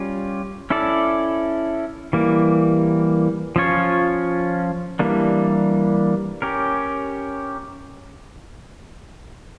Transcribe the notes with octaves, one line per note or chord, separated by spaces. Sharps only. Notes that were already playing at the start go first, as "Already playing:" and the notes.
Already playing: G3 C#4 F4
C#4 E4 A4 D5
E3 G3 A#3
F3 C#4 F4 C#5
E3 G3 A#3 D4
C#4 G4 A#4